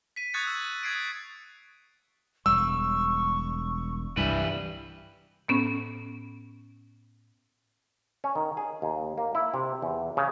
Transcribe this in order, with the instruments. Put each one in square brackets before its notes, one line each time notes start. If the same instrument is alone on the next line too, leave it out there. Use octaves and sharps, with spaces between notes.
[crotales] B6 D#7
C#6 D#6 F#6 G#6 A6 C#7
E6
D#6 G#6 C7 D7
[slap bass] E1 G3 [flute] C#6 [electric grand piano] E6
[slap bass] C2 G2 [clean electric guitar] E3 G3 B4
[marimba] A2 B3 C#4
[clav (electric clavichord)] C#4
D#3
G#4
D#2
A#3
E4
C3
E2
C#3